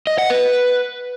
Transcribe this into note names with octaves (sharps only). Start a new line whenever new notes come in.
D#5
F#5
B4